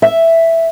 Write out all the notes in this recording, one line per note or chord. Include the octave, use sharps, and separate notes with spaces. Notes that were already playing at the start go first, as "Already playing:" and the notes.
E5